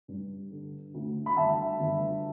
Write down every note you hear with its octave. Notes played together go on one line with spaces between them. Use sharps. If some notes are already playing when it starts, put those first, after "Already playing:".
G2
D3
D2
B5
G1 E5 A5
G1